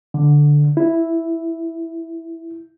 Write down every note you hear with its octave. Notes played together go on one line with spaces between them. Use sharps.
D3
E4